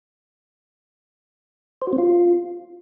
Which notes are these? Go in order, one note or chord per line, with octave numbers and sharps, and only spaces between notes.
C5
F#4
C4
F4